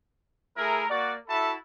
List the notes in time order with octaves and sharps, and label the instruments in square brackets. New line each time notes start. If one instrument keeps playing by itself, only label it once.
[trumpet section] A3 E4 G#4 A#4
A#3 F#4 D5
E4 F#4 A4 E5 A5 B5